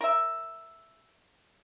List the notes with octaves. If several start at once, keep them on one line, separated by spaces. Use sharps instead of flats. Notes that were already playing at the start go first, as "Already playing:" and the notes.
A#4 E5